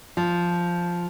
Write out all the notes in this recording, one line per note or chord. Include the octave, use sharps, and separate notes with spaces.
F3